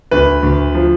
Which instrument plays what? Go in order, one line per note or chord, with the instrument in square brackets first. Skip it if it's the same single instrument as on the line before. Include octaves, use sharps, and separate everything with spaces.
[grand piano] D2 B4
D2
F3